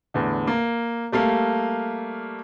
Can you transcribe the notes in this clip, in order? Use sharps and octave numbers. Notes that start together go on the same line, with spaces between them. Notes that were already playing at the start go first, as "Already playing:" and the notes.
E2 A2 D3
A#3
G3 A3 A#3 F5